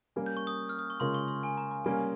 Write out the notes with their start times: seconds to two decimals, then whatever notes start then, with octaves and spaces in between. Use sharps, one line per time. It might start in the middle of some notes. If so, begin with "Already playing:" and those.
0.16 G3 A#3 C#4
0.26 G6
0.37 C#6
0.47 D#6
0.69 F6
0.79 D#6
0.90 C#6
1.00 C#3 G#3 C#4 F4 A#4 C6
1.14 C#6
1.28 C6
1.43 G#5
1.57 A#5
1.71 A#5
1.85 G3 A#3 C#4 G#5